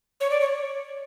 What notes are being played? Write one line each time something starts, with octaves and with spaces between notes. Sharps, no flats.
C#5
D5
C#5